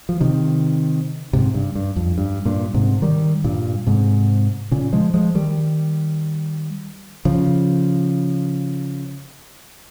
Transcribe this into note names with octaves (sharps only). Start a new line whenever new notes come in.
F3
C3 D#3
G#2 C3
G2
G2
F2
G2
G2 A#2
G#2 C3
D#3 G3
G2 A#2
G#2 C3
A#2 C#3
F3 G#3
F3 G#3
D#3 G3
C#3 F3